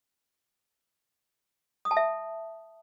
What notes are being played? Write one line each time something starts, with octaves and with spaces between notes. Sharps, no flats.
D#6
A5
E5